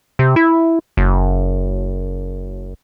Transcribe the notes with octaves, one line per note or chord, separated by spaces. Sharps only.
C3
E4
F#1